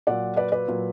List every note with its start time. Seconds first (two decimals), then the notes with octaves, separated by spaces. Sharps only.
0.07 A#2 F#3 D5 F#5
0.36 B4 D5
0.52 B4 D5
0.68 A#2 F#3